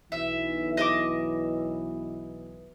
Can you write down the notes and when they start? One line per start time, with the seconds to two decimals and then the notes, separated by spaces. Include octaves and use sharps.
0.12 B1 E3 E5
0.77 D#5 E5 D6